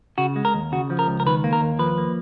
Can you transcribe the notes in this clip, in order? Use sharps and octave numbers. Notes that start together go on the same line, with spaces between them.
C#3 F#4
G#3
A#4
D#2
C#3 F#4
F3
A#4
C#2
A#4
D#3 B4
A#3
A#4
D#2
F3 B4
A#3